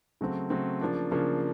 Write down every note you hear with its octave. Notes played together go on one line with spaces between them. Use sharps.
C#3 F#3 A3 C4
C#3 F#3 A3 C4
C#3 F3 A#3 D4
C#3 F3 A#3 D4